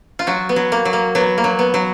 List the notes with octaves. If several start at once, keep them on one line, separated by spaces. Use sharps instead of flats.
F4
F#3 F#4
B3
F#3
A#3
F#3
A#3
F#3 B3
A#3
F#3
B3
F#3